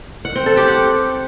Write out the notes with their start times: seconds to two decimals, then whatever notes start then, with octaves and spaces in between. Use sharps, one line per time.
0.25 F#5
0.35 C4
0.46 A4
0.57 G4
0.68 F#5